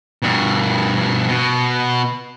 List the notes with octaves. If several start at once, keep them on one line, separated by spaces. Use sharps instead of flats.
G2 B2
B2